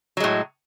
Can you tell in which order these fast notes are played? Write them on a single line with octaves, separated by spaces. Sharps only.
F#3 G#3 A2